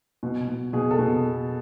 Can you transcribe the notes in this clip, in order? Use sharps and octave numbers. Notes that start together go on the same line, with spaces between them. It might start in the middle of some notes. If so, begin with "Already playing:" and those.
B2
B2
B2 G#4
A4
B2